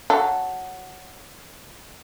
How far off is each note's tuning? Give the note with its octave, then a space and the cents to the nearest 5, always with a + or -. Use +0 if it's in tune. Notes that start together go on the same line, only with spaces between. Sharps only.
F#3 +0 A4 +0